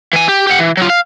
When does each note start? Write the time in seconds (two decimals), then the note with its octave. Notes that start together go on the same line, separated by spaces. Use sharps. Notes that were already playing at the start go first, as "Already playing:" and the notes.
0.13 E3 G#5
0.28 G4
0.47 G4 F#5
0.59 E3
0.77 F#3 F4
0.90 F5